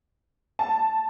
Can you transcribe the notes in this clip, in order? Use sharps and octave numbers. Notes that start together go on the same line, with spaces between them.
A5